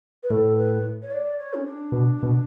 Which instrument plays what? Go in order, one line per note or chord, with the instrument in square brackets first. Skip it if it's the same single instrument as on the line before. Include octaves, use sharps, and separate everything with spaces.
[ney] B4
[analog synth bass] A2 [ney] A4
[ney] B4
C#5
D5
C#5
C#4
D4
[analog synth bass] B2
B2